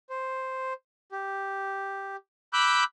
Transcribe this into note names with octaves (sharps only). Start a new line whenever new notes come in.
C5
G4
B5 D6 E6 F#6 G6